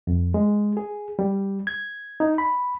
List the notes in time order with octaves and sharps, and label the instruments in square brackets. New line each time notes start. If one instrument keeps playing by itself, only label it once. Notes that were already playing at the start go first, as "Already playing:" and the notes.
[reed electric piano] F2
G#3
G#4
G3
G#6
D#4
B5